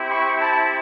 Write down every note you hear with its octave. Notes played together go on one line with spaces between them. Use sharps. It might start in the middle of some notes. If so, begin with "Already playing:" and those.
Already playing: C4 E4 G4
B5 C#6
A5 B5